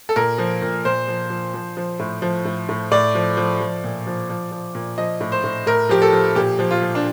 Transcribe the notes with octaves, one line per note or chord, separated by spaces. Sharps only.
A4
A#2 A#4
F3
A#2
A#2 C5
F3
F3
F3
F3
A2
F3
A2
A2
A2 D5
F3
F3
F3
A#2
F3
F3
F3
A#2
F3 D#5
A2
C5
A2
A2 A#4
F3 G4
A4
F3
A#2 G4
F3
F4
F3
D4